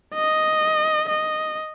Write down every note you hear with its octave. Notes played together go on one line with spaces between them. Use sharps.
D#5
D#5